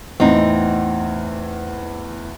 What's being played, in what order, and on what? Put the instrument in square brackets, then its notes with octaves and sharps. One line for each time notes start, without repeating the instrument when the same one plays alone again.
[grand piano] E2 A2 [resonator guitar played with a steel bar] C4 D#4